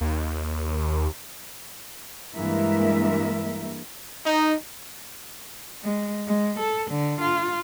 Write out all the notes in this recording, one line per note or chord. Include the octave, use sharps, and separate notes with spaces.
D#2
G2 E3 G#3 A#3 A#4 E5
D#4
G#3
G#3
A4
D3
F4